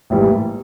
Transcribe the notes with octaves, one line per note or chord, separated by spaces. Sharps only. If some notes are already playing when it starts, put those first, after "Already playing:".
A1 G#2 E3 G3 A#3